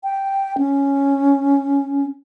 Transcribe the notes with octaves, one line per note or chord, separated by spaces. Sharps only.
G5
C#4